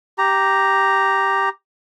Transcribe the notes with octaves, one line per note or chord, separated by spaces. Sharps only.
G4 A#5